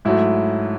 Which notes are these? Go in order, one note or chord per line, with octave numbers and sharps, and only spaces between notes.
G#2 F#3 A3 E4